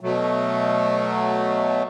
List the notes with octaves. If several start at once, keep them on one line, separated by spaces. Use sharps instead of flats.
B2 F#3 A3